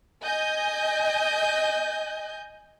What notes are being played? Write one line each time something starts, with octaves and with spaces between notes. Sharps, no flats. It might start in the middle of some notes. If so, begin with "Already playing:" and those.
D#5 G#5 G6